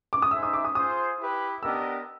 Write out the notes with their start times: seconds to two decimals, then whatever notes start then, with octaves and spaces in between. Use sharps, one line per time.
0.13 D6
0.22 D#6
0.31 D#4 G#4 C5 E5 E6
0.43 D#6
0.53 D6
0.65 D#6
0.75 F4 G#4 C5 D#6
1.19 E4 G4 B4
1.63 B3 D4 G4 A#4 D#5 E6